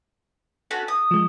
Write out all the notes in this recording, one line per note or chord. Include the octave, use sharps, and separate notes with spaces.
C#4 F#4 A4
D#6
F3 G#3